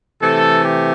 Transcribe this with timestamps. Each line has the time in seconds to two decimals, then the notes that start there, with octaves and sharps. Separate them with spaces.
0.22 C3 E3 A3 A4
0.64 G4